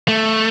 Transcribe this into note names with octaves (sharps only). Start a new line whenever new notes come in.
A3